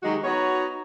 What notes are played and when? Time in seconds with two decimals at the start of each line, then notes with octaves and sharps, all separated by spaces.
0.03 D#3 F#3 G#3 D#4 F#4 G4
0.24 B3 D#4 F#4 C#5